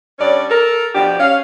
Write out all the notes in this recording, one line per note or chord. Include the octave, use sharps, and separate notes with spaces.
G2 C#4 C#5 D5
A4 A#4
B2 F3 D4 G4
C#4 F5